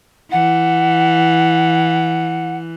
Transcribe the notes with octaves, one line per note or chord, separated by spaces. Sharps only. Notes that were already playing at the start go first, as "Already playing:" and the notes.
E3 F#5